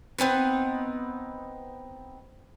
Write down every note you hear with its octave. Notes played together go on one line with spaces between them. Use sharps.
B3 C4 D#4 B4